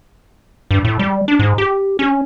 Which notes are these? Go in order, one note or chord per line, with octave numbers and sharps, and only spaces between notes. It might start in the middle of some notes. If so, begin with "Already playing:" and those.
G2
A2
G3
D4
G#2
G4
C#4